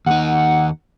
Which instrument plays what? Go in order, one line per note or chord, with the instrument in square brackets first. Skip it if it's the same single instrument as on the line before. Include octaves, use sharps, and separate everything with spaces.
[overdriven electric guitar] D#2 D#4 [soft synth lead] F#5